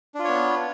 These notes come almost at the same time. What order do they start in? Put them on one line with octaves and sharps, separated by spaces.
D4 F4 C#5 B3